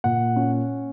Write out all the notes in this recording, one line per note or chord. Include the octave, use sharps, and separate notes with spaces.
A#2 F#5
C#4